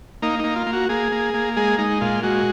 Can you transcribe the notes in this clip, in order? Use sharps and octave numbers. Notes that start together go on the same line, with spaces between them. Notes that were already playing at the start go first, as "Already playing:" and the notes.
A#3 D#4
A#3 D#4
F4
A#3
F#4
A#3 G#4
A#3
A#3
G#3 G#4
G#3 D#4
A#2 F4
G#3 F#4